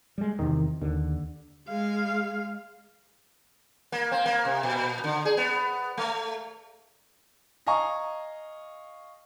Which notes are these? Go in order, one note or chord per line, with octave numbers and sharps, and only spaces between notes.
G3 G#3
E2 C3 D#3
D#2 D3
G#3 F5
A#3
C4
A#3
C3
A#2
D3
G#4
B3
A3
D#5 F5 G#5 A#5 C#6